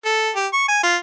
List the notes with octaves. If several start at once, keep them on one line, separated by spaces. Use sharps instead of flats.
A4
G4
C#6
G#5
F4